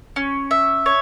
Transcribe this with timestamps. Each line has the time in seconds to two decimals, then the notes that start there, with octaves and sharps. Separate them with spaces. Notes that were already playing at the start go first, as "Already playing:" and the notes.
0.16 C#4
0.51 E5
0.86 C#5